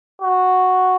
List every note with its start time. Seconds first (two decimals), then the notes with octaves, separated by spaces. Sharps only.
0.22 F#4